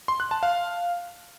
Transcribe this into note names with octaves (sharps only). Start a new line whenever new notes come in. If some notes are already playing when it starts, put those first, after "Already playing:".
C6
F#6
A5
F5